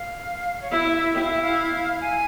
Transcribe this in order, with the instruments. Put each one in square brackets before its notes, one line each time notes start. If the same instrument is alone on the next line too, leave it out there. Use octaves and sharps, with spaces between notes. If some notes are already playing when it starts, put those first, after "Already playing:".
Already playing: [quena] F5
C#5
[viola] E4 [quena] E5
[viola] E4 [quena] G5
[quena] F5
E5
F5
G#5